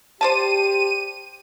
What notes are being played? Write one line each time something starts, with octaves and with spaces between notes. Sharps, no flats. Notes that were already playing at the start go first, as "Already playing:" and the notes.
G4 C5 D5 A5 D#7